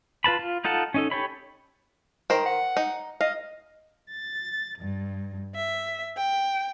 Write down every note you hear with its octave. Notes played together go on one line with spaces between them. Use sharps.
F4 B4 A5 B5
F4
D#4 F4 A4 F#5 A5
C#4 D#4 A4
G4 A4 C#5 B5
D#3 A#4 C5
F#5
D#4
D#5 F5
A6
G2
E5
G5